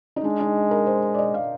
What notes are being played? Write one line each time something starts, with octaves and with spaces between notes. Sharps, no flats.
D#4
G#3 D4
D#4
A#4
C5
D5
D#5
F5